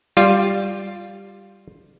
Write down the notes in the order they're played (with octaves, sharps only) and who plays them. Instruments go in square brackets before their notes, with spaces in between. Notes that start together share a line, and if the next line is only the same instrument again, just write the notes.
[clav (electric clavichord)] G3 F4